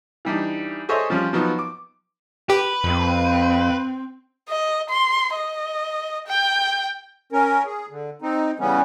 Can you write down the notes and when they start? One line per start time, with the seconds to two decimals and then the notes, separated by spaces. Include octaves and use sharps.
0.25 E3 G3 D4 D#4
0.89 G#4 A4 C5 C#5 D#5 E5
1.10 F3 G3 C#4 F4
1.33 F3 F#3 B3 D#4
1.59 D6
2.50 G4 B4
2.84 F2 C4
4.49 D#5
4.90 C6
5.35 D#5
6.27 G5
7.32 C#4 A#4
7.66 G#4
7.90 D3
8.22 C4 D#4
8.59 C#3 E3 G3 B3 C#4